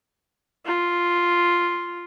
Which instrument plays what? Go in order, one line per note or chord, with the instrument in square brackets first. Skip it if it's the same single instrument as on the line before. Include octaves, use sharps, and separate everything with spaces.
[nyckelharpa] F4